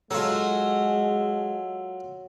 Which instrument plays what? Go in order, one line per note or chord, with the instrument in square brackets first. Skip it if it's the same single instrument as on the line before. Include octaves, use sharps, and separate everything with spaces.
[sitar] F#3 [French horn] G#3 [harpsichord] F4 A4